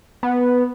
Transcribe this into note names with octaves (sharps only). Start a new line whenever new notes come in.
B3